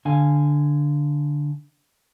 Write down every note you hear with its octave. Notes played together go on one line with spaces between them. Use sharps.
D3 F5 G#5